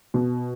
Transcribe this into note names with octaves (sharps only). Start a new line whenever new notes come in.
B2